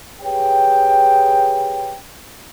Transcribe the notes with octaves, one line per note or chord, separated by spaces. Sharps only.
G4 G#4 B4 C#5 G5